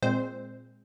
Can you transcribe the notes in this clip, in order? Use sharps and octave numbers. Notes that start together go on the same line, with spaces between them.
A#2 G#3 C4 C5